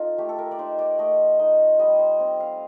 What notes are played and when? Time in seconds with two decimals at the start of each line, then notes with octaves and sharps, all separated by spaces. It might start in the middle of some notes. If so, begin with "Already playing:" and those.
Already playing: D#4 F4 A4
0.18 A3 G4
0.29 A4
0.38 A#4
0.51 D5
0.58 D#4 C5
0.79 D5
0.99 A3 D#5
1.39 D#4 D#5
1.79 G3 D#5
1.99 C5
2.20 C4
2.40 F5